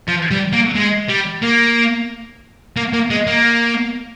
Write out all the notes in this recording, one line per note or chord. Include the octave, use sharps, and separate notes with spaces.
F3
G3
A#3
G#3
G3
A#3
A#3
A#3
G#3
A#3